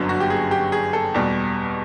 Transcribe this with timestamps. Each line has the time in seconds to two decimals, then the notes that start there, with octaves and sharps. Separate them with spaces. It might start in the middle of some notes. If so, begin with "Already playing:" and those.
Already playing: G1 F#2 D3 F#3
0.09 F#4
0.20 G4
0.30 G#4
0.51 G4
0.72 G#4
0.93 A4
1.14 E2 B2 G3